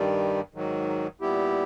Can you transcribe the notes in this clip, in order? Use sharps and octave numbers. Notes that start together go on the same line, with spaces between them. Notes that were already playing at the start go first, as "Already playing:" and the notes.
Already playing: G2 D#3 G3
G#2 D#3 F#3
A#2 G3 B3 E4 G4